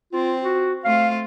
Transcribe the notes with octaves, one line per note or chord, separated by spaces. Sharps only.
C4 F4
F#4
A3 C4 F4 F5